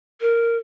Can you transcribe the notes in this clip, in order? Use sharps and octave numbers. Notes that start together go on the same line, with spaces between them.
A#4